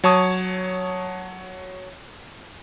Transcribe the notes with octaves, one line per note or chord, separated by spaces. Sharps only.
F#3 C#5 A5 C#6 D#6